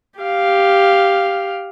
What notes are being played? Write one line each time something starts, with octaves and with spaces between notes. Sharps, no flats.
G4 F5